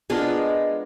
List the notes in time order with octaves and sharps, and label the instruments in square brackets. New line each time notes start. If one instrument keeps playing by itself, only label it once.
[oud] G#3 [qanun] B3 D4 F4 A#4